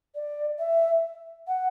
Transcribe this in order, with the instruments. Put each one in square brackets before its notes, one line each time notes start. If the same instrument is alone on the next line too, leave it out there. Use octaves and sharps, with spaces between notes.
[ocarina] D5
E5
F#5